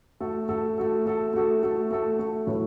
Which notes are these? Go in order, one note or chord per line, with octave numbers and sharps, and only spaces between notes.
A3 F#4 A4
A3 F#4 A4
A3 F#4 A4
A3 F#4 A4
A3 F#4 A4
A3 F#4 A4
A3 F#4 A4
A3 F#4 A4
A2 F#3 A3 E4 B4